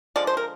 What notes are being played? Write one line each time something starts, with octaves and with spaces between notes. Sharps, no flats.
D3 F3 G#3 D5
C5
A#4